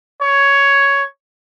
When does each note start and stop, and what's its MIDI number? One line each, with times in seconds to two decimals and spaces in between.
0.22 1.03 73